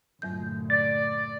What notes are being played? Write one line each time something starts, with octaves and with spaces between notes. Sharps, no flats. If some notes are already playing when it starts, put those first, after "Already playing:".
D2 G2 A#2 F#3 G6
D5 A6